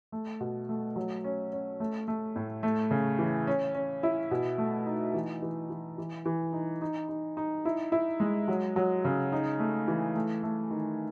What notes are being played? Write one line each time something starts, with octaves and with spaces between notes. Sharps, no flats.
A3
B2
A3
F#3
C#4
C#4
A3
A3
A2
A3
C#3
E3
C#4
C#4
E4
B2
A3
D#4
E3
E3
E3
E3
E3
D#4
D#4
D#4
D#4
E4
E4
G#3
F#3
F#3
C#3
D#4
A3
E3
A3
A3
D#3